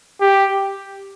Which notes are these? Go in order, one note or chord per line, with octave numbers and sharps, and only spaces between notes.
G4